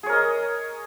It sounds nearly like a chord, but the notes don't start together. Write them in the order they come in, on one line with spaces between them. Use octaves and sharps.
G#4 C#5 A#4 D#5